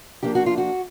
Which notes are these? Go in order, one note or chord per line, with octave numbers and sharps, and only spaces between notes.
F3 A#3 D4 G4
F#4
F4
F#4